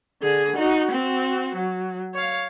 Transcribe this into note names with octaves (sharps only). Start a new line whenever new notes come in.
D3 G#4
D#4 F#4
C4 F#4
F#3
C#5 F5